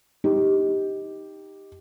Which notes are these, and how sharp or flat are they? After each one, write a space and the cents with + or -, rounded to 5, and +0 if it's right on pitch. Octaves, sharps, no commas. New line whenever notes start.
D#4 +10 G4 +0